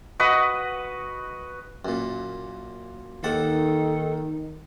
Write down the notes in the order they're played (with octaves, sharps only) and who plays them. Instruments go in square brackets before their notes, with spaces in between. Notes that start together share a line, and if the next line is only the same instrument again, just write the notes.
[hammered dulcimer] F#4 B4 D#5
[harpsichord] F#2 A#2
[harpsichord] D#2 F#5 A5 [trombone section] D#3 [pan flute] A4